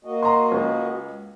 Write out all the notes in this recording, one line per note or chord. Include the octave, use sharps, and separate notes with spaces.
A#3 F#4 D#5
A#5 C6
C#2